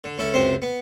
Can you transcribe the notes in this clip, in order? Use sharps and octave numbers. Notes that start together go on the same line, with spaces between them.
D3
C#2 C#4 E4 A4
C#2 F#2 C3 C4 C5
B3